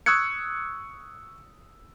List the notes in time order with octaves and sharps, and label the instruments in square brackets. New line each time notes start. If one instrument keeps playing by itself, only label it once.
[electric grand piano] C#6 D#6 E6 F#6 G#6 C#7